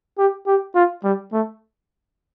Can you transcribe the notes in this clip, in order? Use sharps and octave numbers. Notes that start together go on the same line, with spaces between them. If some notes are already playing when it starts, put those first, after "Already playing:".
G4
G4
F4
G3
A3